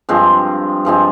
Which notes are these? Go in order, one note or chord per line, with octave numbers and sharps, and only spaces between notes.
G2 F3 G#3 C4
G2 F3 G#3 C4